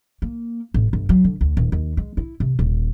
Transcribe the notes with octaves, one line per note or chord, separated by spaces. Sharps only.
A#3
A1
G1
F#3
D3
D2
D#1
D#2
G#3
E4
C3
D#1